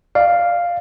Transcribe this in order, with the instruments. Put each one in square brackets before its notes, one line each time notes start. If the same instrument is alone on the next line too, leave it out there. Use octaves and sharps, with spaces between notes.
[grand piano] D5 [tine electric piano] F5